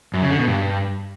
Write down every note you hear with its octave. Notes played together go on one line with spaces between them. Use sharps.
F#2
C#3
D3
B2
G2